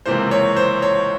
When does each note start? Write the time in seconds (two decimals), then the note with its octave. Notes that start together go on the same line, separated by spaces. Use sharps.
0.06 C#2 C3 E3 A#3 C5
0.31 C#5
0.56 C5
0.82 C#5